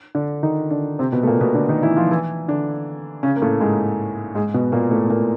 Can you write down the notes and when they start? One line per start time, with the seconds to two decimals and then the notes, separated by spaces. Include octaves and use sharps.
0.15 D3 D4
0.43 D#3 D#4
0.70 D3 D4
0.99 C3 C4
1.12 B2 B3
1.23 A3
1.27 A#2 A#3
1.40 B2 B3
1.54 D3 D4
1.69 D#3 D#4
1.83 E3 E4
1.96 F3 F4
2.11 E3 E4
2.48 D3 D4
3.23 C#3 C#4
3.36 A#3
3.42 A2 A3
3.61 G#2 G#3
4.35 G#2 G#3
4.54 B2 B3
4.72 A#2 A#3
4.91 A2 A3
5.10 A#2 A#3